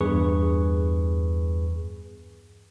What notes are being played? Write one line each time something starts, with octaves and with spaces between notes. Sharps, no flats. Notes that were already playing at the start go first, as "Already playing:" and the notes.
E2 G2 G#4 B4 C#6